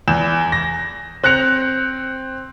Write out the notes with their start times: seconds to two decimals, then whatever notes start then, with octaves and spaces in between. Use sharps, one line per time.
0.08 E2 E7
0.52 A#6
1.24 C4 F#6 A#6 C#7 F7